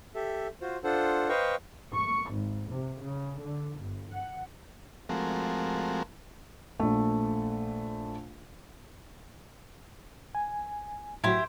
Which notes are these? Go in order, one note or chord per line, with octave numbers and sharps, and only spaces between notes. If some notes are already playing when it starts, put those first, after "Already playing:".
G4 A4 E5
F4 F#4 C5
D4 F4 A4 C5 F#5
B4 C5 D#5 F5 G5 C#6
C#6
G#1
C3
C#3
D3
G1
F#5
F3 G#3 A3 C4 F#4 A#4
A#1 A3
G#5
A2 F#3 E4 F#4 G4 C5